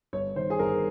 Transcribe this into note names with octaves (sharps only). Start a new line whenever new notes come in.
G1 C#5
D#3 C5
G#4
G1 A#4